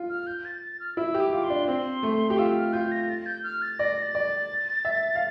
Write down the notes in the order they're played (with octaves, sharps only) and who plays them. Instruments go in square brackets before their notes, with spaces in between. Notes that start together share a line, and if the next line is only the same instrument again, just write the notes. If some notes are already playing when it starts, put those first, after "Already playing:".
Already playing: [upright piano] F4
[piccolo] F6
G6
A6
A6
F6
[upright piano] E4 [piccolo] E6
[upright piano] G4
[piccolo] D6
[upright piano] F4 [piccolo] D6
[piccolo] C6
[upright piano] D4
[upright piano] C4 [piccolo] C6
[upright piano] A3
G4
[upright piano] F4 [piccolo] E6
[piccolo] F6
[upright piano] F4 [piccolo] G6
[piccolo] A#6
A6
G6
F6
A6
[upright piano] D5 [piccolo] A#6
[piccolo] A6
[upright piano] D5
[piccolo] A6
[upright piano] E5
F5